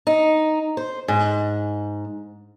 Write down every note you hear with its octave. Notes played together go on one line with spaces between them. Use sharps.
D#4
C5
G#2